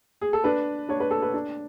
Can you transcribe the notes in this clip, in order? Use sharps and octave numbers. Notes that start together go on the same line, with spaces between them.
G#4
A4
D4 B4
D4 C#5
B4
A4
B4
D4